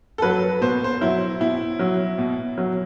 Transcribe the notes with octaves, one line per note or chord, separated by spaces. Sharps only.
A4
F#3 B4
B2 C5
C5
F#3 E4
B2 E4
F#3
B2
F#3